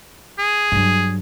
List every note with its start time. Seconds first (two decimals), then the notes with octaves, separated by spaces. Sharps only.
0.39 G#4
0.72 G2 F#3